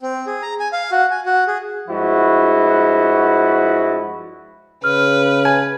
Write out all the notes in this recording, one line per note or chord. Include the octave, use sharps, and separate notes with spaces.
C4
G#4
A#5
G#5
F5
F#4
G#5
F#4
G#4
G2 F3 G#3 E4 F#4
C#3 B4 F6
G#5